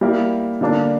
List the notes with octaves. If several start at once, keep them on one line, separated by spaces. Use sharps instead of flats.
G3 A#3 E4
D3 G3 A#3 D4